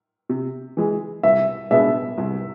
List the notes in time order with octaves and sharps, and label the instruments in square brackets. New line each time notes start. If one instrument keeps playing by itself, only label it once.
[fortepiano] C3
E3 G#3
[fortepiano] C2 [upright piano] E5
[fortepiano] B2 G#3 B3 D4 [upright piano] E5
[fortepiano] C2